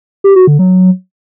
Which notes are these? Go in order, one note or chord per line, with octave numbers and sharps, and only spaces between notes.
G4
F#4
D3
F#3